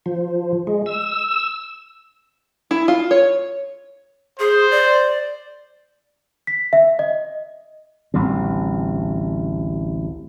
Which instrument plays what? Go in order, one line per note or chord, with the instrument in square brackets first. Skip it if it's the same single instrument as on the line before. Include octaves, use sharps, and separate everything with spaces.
[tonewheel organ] F3
G#3
E6
[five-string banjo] E4
F4
C#5
[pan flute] G#4 [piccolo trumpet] C5
[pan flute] D5
[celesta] B6
E5
D#5
[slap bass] A1 D2 G3 C4